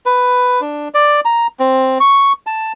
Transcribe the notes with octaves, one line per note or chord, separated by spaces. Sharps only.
B4
D4
D5
A#5
C4
C#6
A5